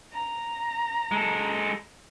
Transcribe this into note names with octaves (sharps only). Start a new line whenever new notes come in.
A#5
G#3 A4